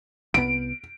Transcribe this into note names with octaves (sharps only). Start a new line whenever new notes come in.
C2 B3 D7